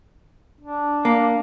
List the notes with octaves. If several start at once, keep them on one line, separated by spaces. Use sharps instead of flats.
D4
A#3